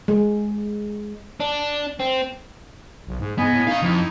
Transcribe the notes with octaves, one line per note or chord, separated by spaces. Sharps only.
G#3
D4
C4
B1
G#2
G#2 B3 D#5 G#5 B5
A2
D4 D#4 F5
F2 E4